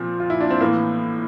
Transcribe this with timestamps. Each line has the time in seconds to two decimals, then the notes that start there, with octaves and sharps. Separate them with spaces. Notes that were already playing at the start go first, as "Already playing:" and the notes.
Already playing: A#2 F3 C4
0.20 F4
0.30 E4
0.41 D4
0.50 C4
0.60 A2 E3 A#3